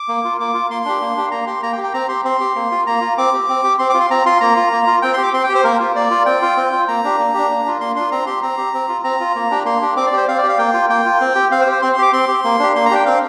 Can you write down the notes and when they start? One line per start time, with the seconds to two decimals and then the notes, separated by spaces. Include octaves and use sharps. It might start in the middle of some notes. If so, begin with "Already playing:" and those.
Already playing: D6
0.08 A#3
0.24 F4
0.40 A#3 D6
0.54 F4
0.70 A#3 C6
0.85 D4 G4
1.01 A#3
1.17 D4 G4
1.31 A#3 A#5
1.47 G4 C6
1.63 A#3 A#5
1.73 G5
1.78 G4
1.84 G5
1.93 C4 A#5
2.09 G4 C6
2.24 C4 C6
2.40 G4
2.56 A#3
2.71 F4
2.87 A#3 A#5
3.01 F4
3.17 C4 D6
3.33 G4
3.49 C4
3.64 G4
3.79 C4 C6
3.90 D6
3.94 F4
4.00 C6
4.10 C4 A#5
4.25 F4 C6
4.40 A#3 A#5
4.56 F4
4.72 A#3
4.87 F4
5.02 C4 G5
5.14 G4 C6
5.23 D6
5.33 C4 C6
5.44 G5
5.49 G4
5.55 C5
5.64 A#3 A#4
5.80 F4
5.95 A#3 D5
6.11 F4
6.26 C4 G5
6.42 F4
6.57 C4
6.72 F4
6.88 A#3 A#5
7.04 D4 G4
7.18 A#3
7.34 D4 G4
7.49 A#3
7.65 D4 F4
7.81 A#3 C6
7.96 D4 F4 C6
8.11 C4 A#5
8.26 G4 C6
8.42 C4 A#5
8.57 G4
8.74 C4
8.89 F4
9.04 C4 A#5
9.20 F4
9.35 A#3
9.51 D4 G4
9.65 A#3 C6
9.82 D4 G4
9.96 C4 D6
10.07 D5
10.12 G4 C5
10.28 C4 F5
10.38 D5
10.43 G4
10.49 F5
10.58 A#3 G5
10.74 F4
10.89 A#3 G5
11.06 F4
11.21 C4
11.35 G4
11.51 C4 F5
11.61 C5
11.66 G4
11.72 C5
11.82 C4 C6
11.93 C6
11.98 G4 D6
12.13 C4 C6
12.28 G4
12.44 A#3
12.59 D4 G4
12.75 A#3 C6
12.85 A#5
12.91 D4 G4 G5
13.05 C4 F5